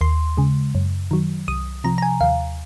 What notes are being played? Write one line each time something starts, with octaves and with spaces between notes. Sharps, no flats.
D#2 C6
C#3 G#3
F#2
D#3 F#3
C2 D#6
C3 F3 A#5
A#5
G#5
D#2 F5